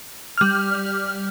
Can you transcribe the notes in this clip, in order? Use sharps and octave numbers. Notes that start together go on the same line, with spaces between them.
G3 F6